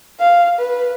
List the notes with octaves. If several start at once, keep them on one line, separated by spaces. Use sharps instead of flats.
F5
B4